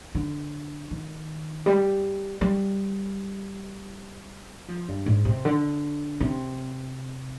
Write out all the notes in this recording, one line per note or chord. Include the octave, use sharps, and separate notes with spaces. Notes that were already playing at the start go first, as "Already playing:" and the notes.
D3
D#3
G3
G3
F3
G2
G#2
C3
D3
C3